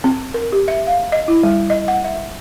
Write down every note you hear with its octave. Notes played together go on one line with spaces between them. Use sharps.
C4
A#4
G4
E5
F5
D#5
E4
G3
D#5
F#5
E5